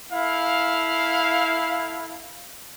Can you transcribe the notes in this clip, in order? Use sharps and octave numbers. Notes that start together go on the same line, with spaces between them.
E4 A4 F5